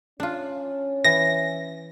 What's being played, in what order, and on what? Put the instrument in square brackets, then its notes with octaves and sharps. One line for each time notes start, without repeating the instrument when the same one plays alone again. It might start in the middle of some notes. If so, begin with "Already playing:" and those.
[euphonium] C#4 [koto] D4 F4
[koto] E3 [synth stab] A#6